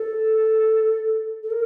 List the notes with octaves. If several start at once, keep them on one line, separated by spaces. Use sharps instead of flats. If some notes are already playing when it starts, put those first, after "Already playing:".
Already playing: A4
A4
A#4